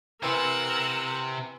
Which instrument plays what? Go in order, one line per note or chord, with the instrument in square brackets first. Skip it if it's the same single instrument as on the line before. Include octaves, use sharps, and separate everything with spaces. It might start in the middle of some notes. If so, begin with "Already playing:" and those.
[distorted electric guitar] C3 [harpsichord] E3 C4 [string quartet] A#4 F#5 E6